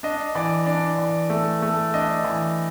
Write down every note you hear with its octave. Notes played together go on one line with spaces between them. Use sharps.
D4 D#5
E3 D5
D4 D5
E3
A3
A3
D4 D#5
E3